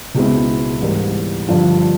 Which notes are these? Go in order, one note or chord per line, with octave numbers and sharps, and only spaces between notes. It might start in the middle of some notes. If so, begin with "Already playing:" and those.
C#2 B2 G#3 C4 E4
G#2 E3 G3 A#3
G2 D3 F3